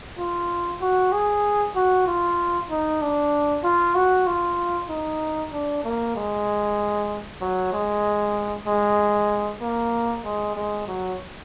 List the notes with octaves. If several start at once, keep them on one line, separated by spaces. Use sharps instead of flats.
F4
F#4
G#4
F#4
F4
D#4
D4
F4
F#4
F4
D#4
D4
A#3
G#3
F#3
G#3
G#3
A#3
G#3
G#3
F#3